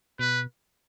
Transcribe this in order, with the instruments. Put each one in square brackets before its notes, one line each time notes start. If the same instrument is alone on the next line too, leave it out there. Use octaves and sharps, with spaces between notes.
[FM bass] B2 [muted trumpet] B4